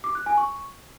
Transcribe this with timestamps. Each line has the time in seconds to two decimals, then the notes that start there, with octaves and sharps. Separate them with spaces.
0.04 D6
0.15 F#6
0.26 G#5
0.37 C#6